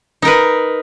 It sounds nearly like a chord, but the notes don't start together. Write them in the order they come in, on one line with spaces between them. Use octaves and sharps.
D#4 A#4 B4